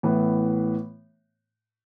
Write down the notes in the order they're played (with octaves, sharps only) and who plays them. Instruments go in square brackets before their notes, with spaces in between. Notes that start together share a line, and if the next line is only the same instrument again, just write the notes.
[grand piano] A2 E3 B3